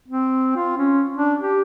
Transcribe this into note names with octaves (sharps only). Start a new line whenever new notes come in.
C4
F4
C#4
D4
G4